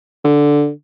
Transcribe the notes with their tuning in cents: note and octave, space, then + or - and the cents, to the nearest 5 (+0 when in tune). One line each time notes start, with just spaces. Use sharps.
D3 -5